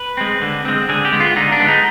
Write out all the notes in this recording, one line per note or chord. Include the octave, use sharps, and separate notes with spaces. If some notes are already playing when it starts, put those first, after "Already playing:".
Already playing: B4
G#3 C4
D3
G#3 C4
D3 G#4
G4
G#3 B3
F4
D3 D#4
D4
G#3 B3
D#4